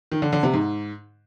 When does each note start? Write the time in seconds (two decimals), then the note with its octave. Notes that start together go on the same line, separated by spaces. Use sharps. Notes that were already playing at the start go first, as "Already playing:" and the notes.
0.12 D#3
0.22 D3
0.33 D3
0.43 C3
0.54 G#2